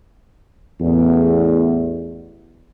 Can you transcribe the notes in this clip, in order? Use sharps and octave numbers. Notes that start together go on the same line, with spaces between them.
A1 E2